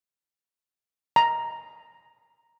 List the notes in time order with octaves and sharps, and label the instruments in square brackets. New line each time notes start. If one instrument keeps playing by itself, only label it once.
[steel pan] A#5